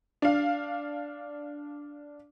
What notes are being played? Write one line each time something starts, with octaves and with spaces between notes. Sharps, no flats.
D4 F5